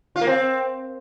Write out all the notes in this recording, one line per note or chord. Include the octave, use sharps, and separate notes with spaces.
F4
A#3
C4